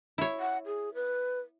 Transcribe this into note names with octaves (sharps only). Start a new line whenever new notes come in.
E4 C#5
F#5
G#4
B4